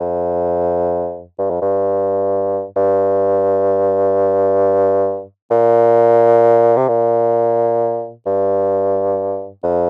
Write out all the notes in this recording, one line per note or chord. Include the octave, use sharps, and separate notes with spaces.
F2
G2
F2
G2
G2
A#2
C3
A#2
G2
F2